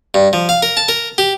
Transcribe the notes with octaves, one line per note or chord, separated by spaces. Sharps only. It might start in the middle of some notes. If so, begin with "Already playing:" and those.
G2
F3
F5
A#4
A5
A#4
G4